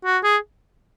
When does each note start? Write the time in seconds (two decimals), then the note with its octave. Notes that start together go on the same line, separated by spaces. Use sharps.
0.05 F#4
0.24 G#4